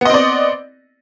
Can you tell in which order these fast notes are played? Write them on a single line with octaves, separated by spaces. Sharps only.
B3 D#5 C4 D5